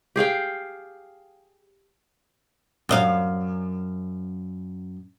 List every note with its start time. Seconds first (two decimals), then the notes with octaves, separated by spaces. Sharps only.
0.16 G4 G#4 F5 G5
2.89 F#2 D#5 F5